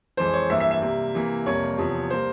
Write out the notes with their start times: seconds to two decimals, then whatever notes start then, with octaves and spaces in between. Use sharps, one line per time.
0.17 F2 E3 G#3 C5
0.33 C#5
0.50 G2 E3 A#3 E5
0.60 E5
0.71 E5
0.81 C3 G3 A#3
1.14 C3 E3 A#3
1.46 F2 C3 G3 A#3 C#5
1.78 E2 C3 F3
2.10 G3 A#3 C5